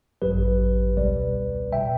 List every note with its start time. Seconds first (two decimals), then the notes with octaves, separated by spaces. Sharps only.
0.22 A1 G2 F#3 G4 B4
0.97 C#2 B2 G3 B4 D5
1.72 B2 G3 E5 G5